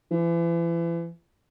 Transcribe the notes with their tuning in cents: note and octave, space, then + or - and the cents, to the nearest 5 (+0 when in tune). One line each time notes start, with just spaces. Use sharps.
E3 +35